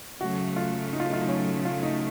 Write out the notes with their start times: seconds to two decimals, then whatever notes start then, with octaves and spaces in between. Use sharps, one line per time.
0.20 C#3 F#3 A3 F#4
0.56 F4
0.93 D#4
1.00 F4
1.07 D#4
1.13 F4
1.21 D#4
1.29 C#4
1.65 F4
1.83 D#4